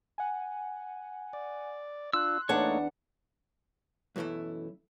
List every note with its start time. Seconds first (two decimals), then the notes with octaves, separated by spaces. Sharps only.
0.18 F#5 G#5
1.33 D5
2.13 D4 F4 C6 E6 F#6
2.49 E2 A3 A#3 D4 D#4 C#5 F#5
4.16 F#2 B2 E3 A3 E4